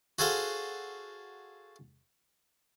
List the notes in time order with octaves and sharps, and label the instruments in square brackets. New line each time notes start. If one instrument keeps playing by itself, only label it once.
[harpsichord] F#4 G#4 A4 C5 F5 C6